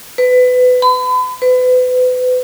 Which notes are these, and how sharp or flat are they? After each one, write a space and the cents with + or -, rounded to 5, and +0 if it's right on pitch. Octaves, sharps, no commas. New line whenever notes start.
B4 +25
B5 +40
B4 +35